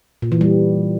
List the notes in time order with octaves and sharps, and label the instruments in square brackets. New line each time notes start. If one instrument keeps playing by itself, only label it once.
[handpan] A#2
E3
G3